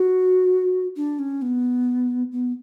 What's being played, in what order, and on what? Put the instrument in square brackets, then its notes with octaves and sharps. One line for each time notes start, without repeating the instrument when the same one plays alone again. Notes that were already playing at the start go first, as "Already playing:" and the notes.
Already playing: [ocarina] F#4
D4
C#4
B3
B3